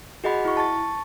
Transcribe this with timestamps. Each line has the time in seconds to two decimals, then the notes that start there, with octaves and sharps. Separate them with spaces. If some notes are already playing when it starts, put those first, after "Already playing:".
0.24 F#4 G#4 D#5 F#5 B5
0.45 E4 C#6
0.57 A5 C#6 A6